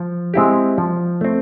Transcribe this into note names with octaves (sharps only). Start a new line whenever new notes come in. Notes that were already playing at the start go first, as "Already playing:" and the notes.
Already playing: F3
G#3 C4 E4 G4
F3
A3 C4